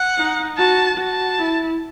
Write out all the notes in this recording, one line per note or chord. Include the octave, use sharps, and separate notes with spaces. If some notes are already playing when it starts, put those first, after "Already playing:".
Already playing: F#5
D#4
F#4 A5
F#4 A5
E4